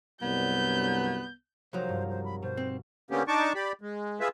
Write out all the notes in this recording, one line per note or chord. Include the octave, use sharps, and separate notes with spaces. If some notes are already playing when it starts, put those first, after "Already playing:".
C2 G2 F#3 B3 G6
C2 F3 F#3 D#4 A#4 C5
G2
C5
B5
B2 C5
C4
D3 A#3 B3 C#4 G4
D4 D#4 A5 C#6 D6
G4 D5 B5
G#3
F4 G#4 B4 E5